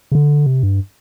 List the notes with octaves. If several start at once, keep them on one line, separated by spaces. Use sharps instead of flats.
C#3
D3
C3
G2